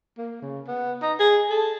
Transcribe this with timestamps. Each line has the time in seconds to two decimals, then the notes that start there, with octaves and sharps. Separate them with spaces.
0.18 A#3
0.42 C#3
0.67 B3
1.02 D#4
1.19 G#4
1.50 A4